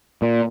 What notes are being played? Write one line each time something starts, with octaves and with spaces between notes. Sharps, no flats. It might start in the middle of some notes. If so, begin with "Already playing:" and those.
A#2